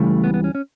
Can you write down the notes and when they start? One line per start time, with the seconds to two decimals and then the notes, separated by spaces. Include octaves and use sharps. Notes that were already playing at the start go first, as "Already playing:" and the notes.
Already playing: C#2 C#3 E3 G3 A3
0.24 B3
0.34 B3
0.44 C#4
0.55 C#4